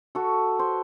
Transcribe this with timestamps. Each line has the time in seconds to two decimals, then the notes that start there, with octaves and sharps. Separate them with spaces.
0.15 F#4 A4
0.59 C5